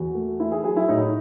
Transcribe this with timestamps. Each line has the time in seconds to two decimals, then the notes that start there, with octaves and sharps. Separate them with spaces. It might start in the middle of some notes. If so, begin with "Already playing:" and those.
Already playing: E2 F#4
0.15 A3
0.40 A3 E4
0.52 G#4
0.64 F#3 G#4
0.77 E4
0.88 A2 D#4